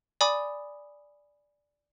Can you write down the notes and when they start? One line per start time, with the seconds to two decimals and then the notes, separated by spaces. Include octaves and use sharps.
0.21 D5 G#5 B5 D6 D#6